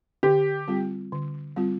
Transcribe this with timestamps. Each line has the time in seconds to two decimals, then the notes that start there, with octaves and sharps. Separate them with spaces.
0.23 D3 G4
0.68 G3 C4 F4
1.12 D3
1.56 G3 C4 F4